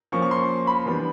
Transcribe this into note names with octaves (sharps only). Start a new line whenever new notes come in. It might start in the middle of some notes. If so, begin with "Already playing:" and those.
F3 A#3 C#4 C#6
C#6
C6
B5
E3 G3 B3 D4